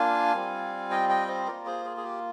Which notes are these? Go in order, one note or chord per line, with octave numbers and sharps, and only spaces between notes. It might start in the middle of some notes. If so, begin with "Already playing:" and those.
Already playing: A#3 D4 F4 F5 G#5
G3 C4 F4
D#5 G5
D#5 G5
C5 D#5
A#3 F4 A#4 D5
G#4 C5
G#4
G#4
G4